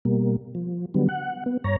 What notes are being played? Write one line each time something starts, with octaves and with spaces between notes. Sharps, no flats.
B2 G3 A#3
F3
D3 F#3 G3 B3
F#5
B3
G2 C#5 A#5